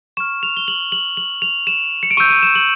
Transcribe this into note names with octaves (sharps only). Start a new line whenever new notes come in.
C#6 F6 E7
F7
G7
F#7
F#7
F#7
F7
E7
C#7
D7
C#6 E6 G6 D#7
D#7
E7
F#7